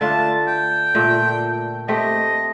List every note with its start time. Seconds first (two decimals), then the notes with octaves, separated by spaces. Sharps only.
0.01 D3 A3 D4 F4 A5
0.47 G5
0.95 A#2 A3 D4
1.88 A3 C4 G4 D#5